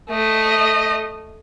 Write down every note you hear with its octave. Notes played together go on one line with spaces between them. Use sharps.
A3 D#5